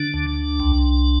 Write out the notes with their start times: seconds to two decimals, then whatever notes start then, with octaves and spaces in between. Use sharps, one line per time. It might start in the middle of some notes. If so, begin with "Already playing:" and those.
Already playing: D3 D4
0.14 D2
0.60 C2